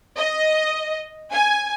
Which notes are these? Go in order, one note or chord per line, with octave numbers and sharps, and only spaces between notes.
D#5
G#5